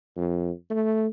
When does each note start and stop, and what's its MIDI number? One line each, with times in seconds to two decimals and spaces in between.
0.17 0.51 41
0.70 1.07 57